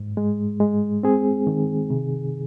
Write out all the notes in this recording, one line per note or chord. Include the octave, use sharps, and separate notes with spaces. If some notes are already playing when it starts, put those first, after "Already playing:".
Already playing: G#2
G#3
G#3
C4 G#4
D#3
C3